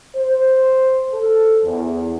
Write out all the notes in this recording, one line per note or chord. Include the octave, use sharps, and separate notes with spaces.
C5
A4
E2